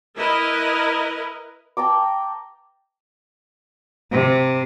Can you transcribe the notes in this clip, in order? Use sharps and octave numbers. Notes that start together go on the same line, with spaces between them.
E4 A#4 B4 D#5
G5 A5 A#5 D6
C3